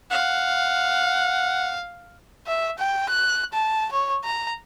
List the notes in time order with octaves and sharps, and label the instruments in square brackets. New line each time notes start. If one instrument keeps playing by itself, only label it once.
[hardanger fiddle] F5 [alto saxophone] F#5
[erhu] E5
G5
F#6
A5
C#5
A#5